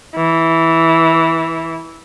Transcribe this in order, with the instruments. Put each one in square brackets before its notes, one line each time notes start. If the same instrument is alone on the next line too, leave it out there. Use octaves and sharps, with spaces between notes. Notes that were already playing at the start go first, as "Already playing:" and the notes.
[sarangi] E3